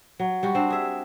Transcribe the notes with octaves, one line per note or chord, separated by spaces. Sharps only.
F#3
G3 F#4
C4 D4
G#4 E5